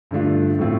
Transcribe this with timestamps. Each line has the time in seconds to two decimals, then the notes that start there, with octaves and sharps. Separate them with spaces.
0.11 G2 D3 A3 D4 F4
0.59 A2 F3 A3 C4 F4